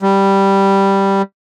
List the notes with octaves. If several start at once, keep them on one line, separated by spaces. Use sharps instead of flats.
G3